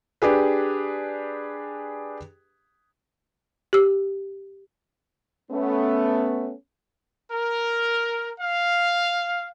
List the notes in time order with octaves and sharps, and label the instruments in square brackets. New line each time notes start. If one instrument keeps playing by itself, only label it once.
[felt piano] D4 G4 G#4 B4
[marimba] G4 E6
[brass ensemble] A3 B3 C#4
[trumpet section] A#4
F5